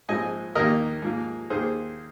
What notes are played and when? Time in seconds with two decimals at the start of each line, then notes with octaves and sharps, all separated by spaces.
0.08 A#1 G#2 F3 G#3 C4 D#5 G#5
0.55 D#2 D#3 A#3 A#4 D#5
1.02 G#2 F3 A#3
1.50 D#2 D#3 A#3 D#4 G#4 C5